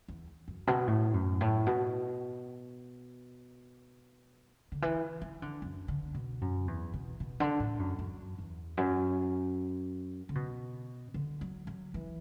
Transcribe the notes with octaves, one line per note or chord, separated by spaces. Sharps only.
E2
F#2
B2
A2
F#2
A2
B2
D3
E3
E3
D3
F#2
D3
B2
F#2
E2
B2
B2
D3
A2
F#2
F#2
E2
F#2
D3
B2
D3
F#3
F#3
E3